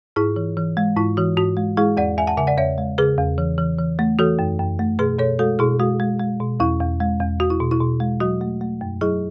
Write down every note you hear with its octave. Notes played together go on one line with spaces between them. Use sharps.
G#2 E4 G#4
E3
E3
G#3
G#2 E4
E3 F#4
G#2 F#4
G#3
G#3 E4 G#4
E2 D5 F#5
E2 E5 G#5
F#5 A5
C#3 E5 G#5
D5 F#5
E2 C#5 E5
G#3
C#3 G#4 B4
E2
E3
E3
E3
A3
E3 F#4 A4
F#2
F#2
A3
B2 G#4 B4
B2 A4 C#5
G#3 F#4 A4
B2 E4 G#4
G#3 F#4
G#3
G#3
B2
E2 E4
E2
G#3
E2
E2 F#4
E4
B2
E4
B2
G#3
F#3 F#4
A3
A3
F#2
F#3 E4 G#4